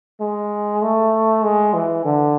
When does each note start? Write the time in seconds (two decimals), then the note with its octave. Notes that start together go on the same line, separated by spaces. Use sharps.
0.20 G#3
0.82 A3
1.44 G#3
1.74 E3
2.05 D3